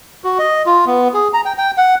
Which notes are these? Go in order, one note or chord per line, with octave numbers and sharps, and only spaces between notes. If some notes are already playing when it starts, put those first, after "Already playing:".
F#4
D#5
F4
B3
G#4
A#5
G5
G5
F#5